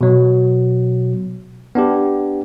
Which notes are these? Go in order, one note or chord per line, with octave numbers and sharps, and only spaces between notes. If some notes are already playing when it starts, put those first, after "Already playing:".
B2 F#3
B3 D4 G4